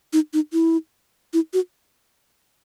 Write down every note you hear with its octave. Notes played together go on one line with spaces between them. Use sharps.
D#4
D#4
E4
E4
F#4